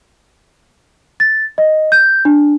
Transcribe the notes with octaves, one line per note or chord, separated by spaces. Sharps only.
A6
D#5
G6
D4